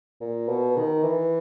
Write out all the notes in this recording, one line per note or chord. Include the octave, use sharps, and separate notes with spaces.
A#2
B2
D#3
E3